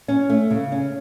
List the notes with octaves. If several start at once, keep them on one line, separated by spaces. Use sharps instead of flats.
C#4
A3
C#3
C#4